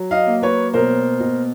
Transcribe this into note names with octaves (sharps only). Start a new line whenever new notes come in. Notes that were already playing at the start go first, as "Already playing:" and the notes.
Already playing: F#3
D#5 F5
A#3
B4 C#5
B2 A#4 C5
B2